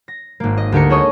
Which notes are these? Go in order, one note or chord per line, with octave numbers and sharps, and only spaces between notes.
A#6
G#1 A#3
D#5
D2 G4 A#4 C#7
G#4 A4 C#5 D#5 C#6 D#6